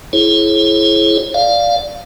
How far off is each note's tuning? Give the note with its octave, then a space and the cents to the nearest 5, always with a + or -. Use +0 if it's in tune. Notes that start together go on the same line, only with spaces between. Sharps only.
E4 +15 G#4 +35 C#5 -40
D5 +0 F5 +0